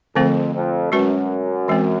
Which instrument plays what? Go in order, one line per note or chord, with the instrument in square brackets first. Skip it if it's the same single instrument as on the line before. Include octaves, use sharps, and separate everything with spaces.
[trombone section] F2 [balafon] D3 F3 A3 C4
[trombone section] F2
[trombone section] F#2 [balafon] G#3 C#4 F#4 B4
[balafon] E3 G#3 C4